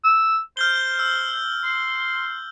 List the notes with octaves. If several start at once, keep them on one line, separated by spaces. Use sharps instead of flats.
E6
C5 F6 G6 G7
E6
C6